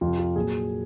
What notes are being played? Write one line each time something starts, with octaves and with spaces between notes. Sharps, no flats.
F2 C3 F3 F4
F4
A#2 F#3 G#4